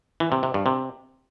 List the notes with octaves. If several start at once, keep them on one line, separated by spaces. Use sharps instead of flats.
E3
C3
C3
G2
C3